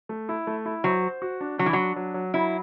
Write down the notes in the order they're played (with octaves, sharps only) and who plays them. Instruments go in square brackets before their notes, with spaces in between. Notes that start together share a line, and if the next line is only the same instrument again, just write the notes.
[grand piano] A3
E4
A3
E4
[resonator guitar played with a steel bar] F#3 [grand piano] C5
[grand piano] C5
F#4
D4
[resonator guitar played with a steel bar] F#3 [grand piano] D4
[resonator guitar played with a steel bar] E3
[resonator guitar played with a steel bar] F#3 [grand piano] D4
[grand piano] F#3
F#3
[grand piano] F#3 [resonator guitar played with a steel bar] E4